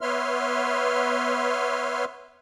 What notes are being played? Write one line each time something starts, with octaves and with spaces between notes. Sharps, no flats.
B3 B4 C#5 E5 C6 F6